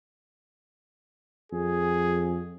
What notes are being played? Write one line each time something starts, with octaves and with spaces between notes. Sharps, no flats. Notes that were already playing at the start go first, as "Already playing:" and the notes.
F2 G#4